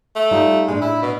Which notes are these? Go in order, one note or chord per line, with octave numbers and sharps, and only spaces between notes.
A3
G3 D#4 F4
A2 G#3 D4
E4
B2